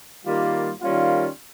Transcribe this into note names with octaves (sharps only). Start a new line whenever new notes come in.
D#3 G3 A#3 F4
D#3 G3 A#3 C#4 F4